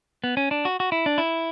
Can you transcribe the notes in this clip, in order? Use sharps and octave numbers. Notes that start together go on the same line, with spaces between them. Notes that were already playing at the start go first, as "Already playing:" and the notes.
B3
C#4
D4
F#4
F#4
E4
D4
E4